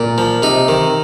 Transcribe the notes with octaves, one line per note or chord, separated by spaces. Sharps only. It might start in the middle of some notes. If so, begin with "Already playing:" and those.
Already playing: A#2
F3
C3 D#4
D#3